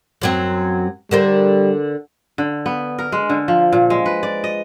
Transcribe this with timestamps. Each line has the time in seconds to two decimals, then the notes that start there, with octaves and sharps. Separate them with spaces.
0.22 F#2 F#3 C4
1.11 D3 G3 A#4 C5
2.38 D3
2.66 B3
2.99 A#4
3.12 G#3
3.30 D3
3.48 F3
3.72 A#2
3.90 G#3
4.06 B4
4.23 D5
4.44 D#5